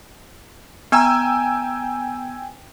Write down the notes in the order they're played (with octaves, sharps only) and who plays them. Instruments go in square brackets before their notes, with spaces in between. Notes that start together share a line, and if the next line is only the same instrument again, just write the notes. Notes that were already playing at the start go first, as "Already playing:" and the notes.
[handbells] B3 A#5 [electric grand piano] G5 G#5 E6